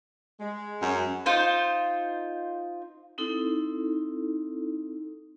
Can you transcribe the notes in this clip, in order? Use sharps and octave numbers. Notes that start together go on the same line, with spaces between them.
G#3
F#2
D#4 F4 C5
C4 D#4 E4 A4